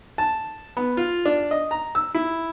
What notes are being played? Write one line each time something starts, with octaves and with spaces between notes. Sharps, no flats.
A5
B3
F4
D4
D#5
A#5
E6
E4